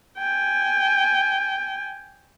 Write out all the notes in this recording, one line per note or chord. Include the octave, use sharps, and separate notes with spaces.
G5 G#5